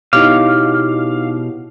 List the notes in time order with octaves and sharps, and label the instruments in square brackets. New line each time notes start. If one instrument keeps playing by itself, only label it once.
[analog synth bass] B2 [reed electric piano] D#4 D6 [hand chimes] E4 G4 C#5 [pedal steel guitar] F5